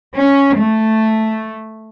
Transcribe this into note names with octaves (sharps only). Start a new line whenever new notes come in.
C#4
A3